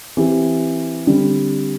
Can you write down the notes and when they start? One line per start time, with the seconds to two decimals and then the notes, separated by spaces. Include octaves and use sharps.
0.17 E3 C4 G4
1.07 D3 G3 C4